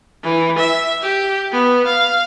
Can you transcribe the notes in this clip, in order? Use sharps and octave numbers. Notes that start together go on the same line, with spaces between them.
E3
E5
G4
B3
F5